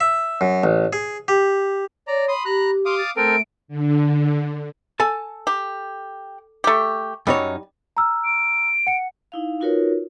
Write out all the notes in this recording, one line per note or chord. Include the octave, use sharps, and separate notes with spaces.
E5
F#2
A1
G#4
G4
C#5 D5 A#5
B5 C6 D#6
G4 A#5 F#6
F5 C6 D6 D#6
A6
A3 C4 A4 A#4 D7
D3
A4 G#5 A5
G4
A3 G4
F#2 G3 D#4 C#5
A#5 E6 F6
D7
F#5 C#7
D#4 E4 F5
D#4 F4 F#4 A#4 B4 C#5